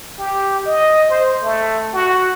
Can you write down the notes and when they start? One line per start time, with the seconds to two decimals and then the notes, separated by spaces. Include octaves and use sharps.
0.19 G4
0.66 D#5
1.10 C5
1.43 A3
1.94 F#4